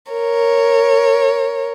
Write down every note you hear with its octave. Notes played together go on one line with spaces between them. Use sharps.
A#4 C#5